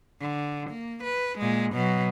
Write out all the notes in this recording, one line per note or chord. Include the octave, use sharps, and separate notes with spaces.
D3
A#3
B4
A#2 G#3
B2 F#3